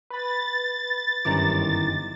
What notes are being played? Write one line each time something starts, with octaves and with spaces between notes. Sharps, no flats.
B4 B5 A6
G1 F#2 D#3 E3 A#5 D6